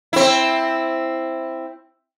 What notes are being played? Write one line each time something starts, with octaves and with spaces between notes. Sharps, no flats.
C4 E4